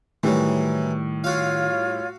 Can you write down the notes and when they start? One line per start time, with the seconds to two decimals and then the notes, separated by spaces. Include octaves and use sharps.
0.23 A2 D#3 E3 F#3 G3
1.24 F4 F#4 C#5 F5